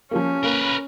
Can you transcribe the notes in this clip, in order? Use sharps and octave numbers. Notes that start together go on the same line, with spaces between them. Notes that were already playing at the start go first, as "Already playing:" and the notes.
F3 G3 A#3 C#4
A#3 A#4 B4